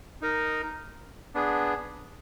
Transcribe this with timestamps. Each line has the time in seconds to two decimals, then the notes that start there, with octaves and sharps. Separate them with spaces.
0.22 D#4 A#4 D#5
1.35 B3 D4 G#4